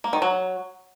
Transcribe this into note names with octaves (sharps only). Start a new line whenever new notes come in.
A#3
D#3
F#3